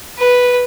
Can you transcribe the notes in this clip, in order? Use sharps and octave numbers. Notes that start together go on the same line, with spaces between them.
B4